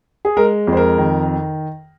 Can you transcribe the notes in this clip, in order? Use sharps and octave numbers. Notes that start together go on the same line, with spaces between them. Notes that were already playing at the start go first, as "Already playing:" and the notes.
G#4
G#3 A#4
F2
C5
A#4
D#3